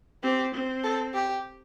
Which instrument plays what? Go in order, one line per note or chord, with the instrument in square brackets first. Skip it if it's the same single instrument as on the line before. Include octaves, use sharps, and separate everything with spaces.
[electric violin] C4 [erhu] G4
[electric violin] C4
[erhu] A4
G4